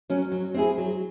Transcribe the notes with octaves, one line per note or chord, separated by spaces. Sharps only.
F#3 C#4
F#3
C4 E4 G#4
F#3